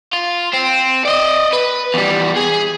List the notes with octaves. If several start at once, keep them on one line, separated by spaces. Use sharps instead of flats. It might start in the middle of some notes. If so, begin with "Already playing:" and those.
F4
C4
D5 D#5
B4
E2 G3
G#4